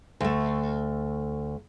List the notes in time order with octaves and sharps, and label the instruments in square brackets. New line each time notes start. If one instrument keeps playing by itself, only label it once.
[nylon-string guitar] D2 A3